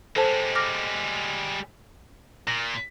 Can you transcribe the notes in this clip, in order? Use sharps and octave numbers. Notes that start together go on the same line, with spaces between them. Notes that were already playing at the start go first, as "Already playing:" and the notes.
G3 G#3 A4 C5 A5
D6 F6 A#6
A#2 A#6